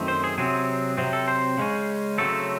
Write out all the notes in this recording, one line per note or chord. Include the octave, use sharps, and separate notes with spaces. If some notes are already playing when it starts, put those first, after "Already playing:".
Already playing: F#2 D#3 A3 C4
C5
G#4
C3 F#3 C4 G#4
C3 F#3 C4
A4
C5
C#3 G#3 C#4
C#3 F#3 A3 C4 A4